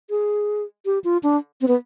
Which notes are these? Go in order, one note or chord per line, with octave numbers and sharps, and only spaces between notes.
G#4
G4
F4
D4
C4
B3